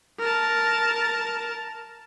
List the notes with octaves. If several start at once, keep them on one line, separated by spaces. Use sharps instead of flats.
A#4 A5